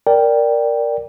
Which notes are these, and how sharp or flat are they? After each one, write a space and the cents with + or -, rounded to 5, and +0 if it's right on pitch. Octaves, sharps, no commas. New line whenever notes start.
A#4 +0 D5 +0 G5 +0